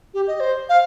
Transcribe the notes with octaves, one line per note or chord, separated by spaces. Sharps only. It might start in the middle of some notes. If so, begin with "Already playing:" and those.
G4
D#5
C5
F5